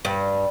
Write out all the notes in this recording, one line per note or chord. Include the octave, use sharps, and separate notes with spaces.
G2